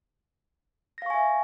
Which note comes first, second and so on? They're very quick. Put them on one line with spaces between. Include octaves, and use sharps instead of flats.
A#6 F5 C#6 G#5 E5